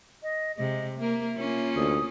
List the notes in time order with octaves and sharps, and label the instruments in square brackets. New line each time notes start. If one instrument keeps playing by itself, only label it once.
[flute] D#5
[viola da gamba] C3 G#3 [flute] D#5
[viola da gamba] A#3 A#4 [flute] E5
[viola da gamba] A#3 C#4 F4
[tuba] D2 [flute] D#6